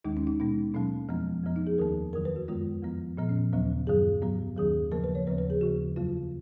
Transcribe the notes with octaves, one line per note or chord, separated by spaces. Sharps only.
D#2 D#3 G#3 D#4
C#4
D#4
B2 G#3 B3 D#4
B2 F#3 A#3 C#4
F2 F3 G#3 B3
F2 F3 B3
D#4
G#4
D#2 D#3 A#3 A#4
F2 D#3 F#3 A#4
B4
F#4
F#2 D#3 G#3 B3 F4
F2 F3 B3
A#2 F3 B3
C#4
D#2 C#3 F#3 B3
F#2 D#3 F#3 G#4
G#2 F#3 B3
D#2 D#3 F#3 G#4
D#2 C#3 F3 A#3 A#4
B4
C#5
D#2 C#3 F3 B3 B4
B4
G#4
D#2 C#3 F3 F#4
F2 C#3 F#3 A#3 F4